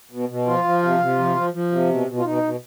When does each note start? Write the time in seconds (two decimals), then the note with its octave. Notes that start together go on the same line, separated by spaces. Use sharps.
0.11 B2
0.29 B2
0.47 F3 F4
0.64 F3
0.83 C3
1.00 C3
1.18 F3
1.36 F3
1.53 F3
1.71 C3
1.89 B2
2.07 B2
2.18 F4
2.25 B2 D#4
2.43 B2